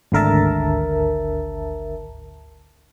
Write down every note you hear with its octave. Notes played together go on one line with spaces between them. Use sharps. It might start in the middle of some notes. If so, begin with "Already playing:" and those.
G#1 D2 D3 A#4 E5 A5